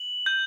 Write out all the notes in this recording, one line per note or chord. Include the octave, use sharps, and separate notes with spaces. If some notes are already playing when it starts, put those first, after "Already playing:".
Already playing: F#7
G6